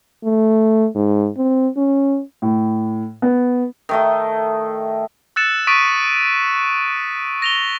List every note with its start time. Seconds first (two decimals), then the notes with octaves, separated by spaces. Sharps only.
0.24 A3
0.95 G#2
1.37 C4
1.77 C#4
2.42 A2
3.22 B3
3.89 D#3 A3 D#5
5.36 E6 F#6 A6 C#7 E7
5.67 C#6 D#6 A6 B6 D7 D#7
7.42 A#6 F7 G7